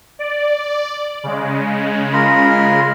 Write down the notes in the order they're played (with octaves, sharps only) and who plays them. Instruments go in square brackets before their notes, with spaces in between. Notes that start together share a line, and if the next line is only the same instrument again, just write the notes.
[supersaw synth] D5
C#3 G#3
[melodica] F4 A#4 B5